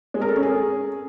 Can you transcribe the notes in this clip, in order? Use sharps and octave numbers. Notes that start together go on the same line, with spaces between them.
G#3
A#4
A4
C#4
G#4